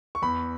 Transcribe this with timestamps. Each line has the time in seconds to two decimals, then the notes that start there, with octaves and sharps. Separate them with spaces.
0.15 C#6
0.22 E2 B5